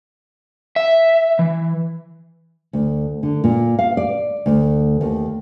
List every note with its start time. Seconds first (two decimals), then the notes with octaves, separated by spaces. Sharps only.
0.76 E5
1.39 E3
2.73 D2
3.23 D3
3.44 A#2
3.79 F5
3.97 D5
4.46 D2
5.01 D#2